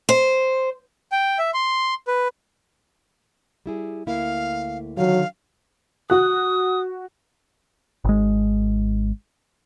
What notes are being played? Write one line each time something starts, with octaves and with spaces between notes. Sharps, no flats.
C5
G5
E5
C6
B4
G3 E4 G#4
D2 A#3 E4 F5
D3 D#3 F#3 F5
F#4 D#6 F#6
G#1 G#3